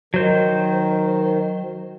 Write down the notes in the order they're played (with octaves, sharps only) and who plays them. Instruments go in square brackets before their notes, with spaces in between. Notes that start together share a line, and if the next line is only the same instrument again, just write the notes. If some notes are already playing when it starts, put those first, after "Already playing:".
[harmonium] D#3 [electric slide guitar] F#3 C5